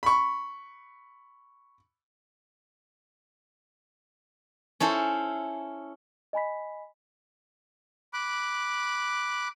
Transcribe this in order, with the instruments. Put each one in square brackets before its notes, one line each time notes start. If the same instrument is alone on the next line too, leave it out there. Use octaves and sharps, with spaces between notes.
[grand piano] B5 C#6
[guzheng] C#4 E4 A4 C5
[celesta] D#5 G#5 B5 B6
[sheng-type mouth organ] B5 D6 F#6